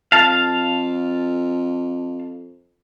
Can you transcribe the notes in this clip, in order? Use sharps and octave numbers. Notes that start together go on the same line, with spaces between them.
F2 F5 A5